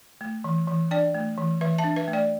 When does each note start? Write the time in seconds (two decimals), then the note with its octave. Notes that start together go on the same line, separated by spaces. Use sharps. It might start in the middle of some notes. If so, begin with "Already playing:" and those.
0.21 A3
0.44 E3
0.68 E3
0.91 D4 D5 G5
1.14 A3
1.38 E3
1.61 E3 B4 E5
1.78 E5 A5
1.84 D4
1.96 B4 E5
2.08 A3
2.13 D5 G5